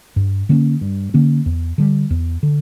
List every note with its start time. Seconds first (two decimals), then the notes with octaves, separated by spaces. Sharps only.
0.16 G2
0.49 D3 A#3 C#4
0.81 G2
1.14 D3 A#3 C#4
1.46 E2
1.78 D3 G3
2.10 E2
2.43 D3